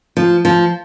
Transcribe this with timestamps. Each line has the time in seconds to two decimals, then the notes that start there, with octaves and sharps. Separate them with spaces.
0.17 F3
0.45 F3